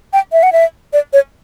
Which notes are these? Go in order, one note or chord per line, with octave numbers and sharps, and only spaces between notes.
G5
E5
F#5
E5
D5
C#5